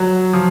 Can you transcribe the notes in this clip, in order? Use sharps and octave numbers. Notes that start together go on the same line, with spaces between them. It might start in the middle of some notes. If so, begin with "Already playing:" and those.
Already playing: F#3
F3